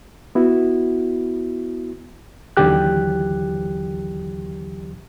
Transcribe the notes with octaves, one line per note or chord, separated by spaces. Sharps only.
B3 E4 F#4
D#2 D3 E3 F#3 G4 F#6